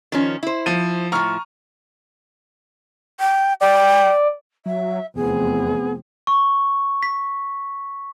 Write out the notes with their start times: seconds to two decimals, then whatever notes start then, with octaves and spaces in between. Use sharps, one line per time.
0.12 D#3 F3 C#4
0.43 E4 C5
0.66 F3 D#7
1.12 A2 F3 A#5 C#6 F6
3.20 G5
3.61 D5 G5
4.66 F#3 E5
5.16 F1 E2 B3 C4 G#4
6.27 C#6
7.03 B6